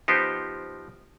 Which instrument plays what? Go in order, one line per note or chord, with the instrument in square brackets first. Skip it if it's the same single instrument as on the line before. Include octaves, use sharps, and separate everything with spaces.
[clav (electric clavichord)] F3 B3 D#4 G4 C5